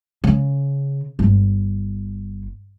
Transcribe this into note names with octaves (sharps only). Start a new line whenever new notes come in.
C#3
G1